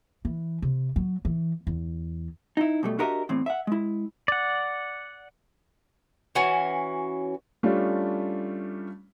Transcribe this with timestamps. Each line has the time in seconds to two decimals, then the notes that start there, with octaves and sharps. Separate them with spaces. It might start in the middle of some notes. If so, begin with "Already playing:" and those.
0.25 E3
0.62 C3
0.96 F#3
1.25 E3
1.67 E2
2.57 D#4 E4
2.83 B2 G3 A3
2.99 D4 F#4 G4 A#4 D#5 E5
3.29 E2 A2 C4
3.46 E5 F#5
3.67 G#3 E4
4.28 D5 F#5
6.35 E3 C#4 F#4 G#5
7.63 G3 A3 C#4 D4 F4